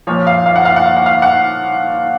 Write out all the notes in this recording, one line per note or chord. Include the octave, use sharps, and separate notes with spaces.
A#2 F3 C#5
F5
F5
F#5
F5
F#5
F5
F#5
F5
F#5